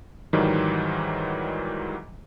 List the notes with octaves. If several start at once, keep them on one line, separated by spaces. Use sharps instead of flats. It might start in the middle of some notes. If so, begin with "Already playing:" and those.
G#2 D#3 E3 F#3 G3